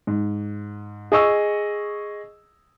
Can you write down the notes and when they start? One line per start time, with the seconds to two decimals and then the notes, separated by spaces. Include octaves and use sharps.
0.07 G#2
1.12 G#4 D#5 C#6 E6